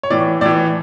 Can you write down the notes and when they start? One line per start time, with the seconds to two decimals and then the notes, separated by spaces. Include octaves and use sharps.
0.03 C#5
0.10 A2 E3 D5
0.41 A2 D5
0.46 E3